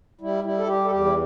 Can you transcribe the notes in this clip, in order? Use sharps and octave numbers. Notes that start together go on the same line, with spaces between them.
G3 E4
G3 E4
A4
G3 G4
A4
E2 G4
E4